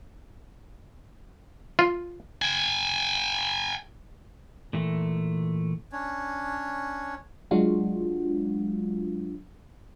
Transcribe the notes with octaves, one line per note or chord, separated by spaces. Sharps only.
F4
G5 G#5
A#2 E3 A3
C#4 D4 C#5
F#3 G#3 D4 F4 F#4